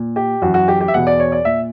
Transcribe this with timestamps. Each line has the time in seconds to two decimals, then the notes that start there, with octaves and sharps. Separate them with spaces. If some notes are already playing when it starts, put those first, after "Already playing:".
Already playing: A#2
0.16 G4
0.42 F#2 E3 F#4
0.54 F#4
0.68 G4
0.81 G4
0.88 E5
0.94 E2 B2 F#5
1.07 D5
1.20 C#5
1.32 D5
1.45 A#2 E5